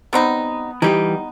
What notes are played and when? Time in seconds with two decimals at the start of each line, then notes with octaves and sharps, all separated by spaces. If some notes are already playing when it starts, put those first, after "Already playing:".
0.13 G3 B3 C4 D#4
0.82 E3 G3 D#4 G4